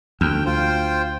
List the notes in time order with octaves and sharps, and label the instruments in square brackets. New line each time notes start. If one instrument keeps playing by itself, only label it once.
[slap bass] D2 [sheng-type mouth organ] G5
[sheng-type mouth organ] F4 C5 G5